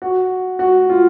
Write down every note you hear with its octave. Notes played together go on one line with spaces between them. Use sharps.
F#4
F#4
F4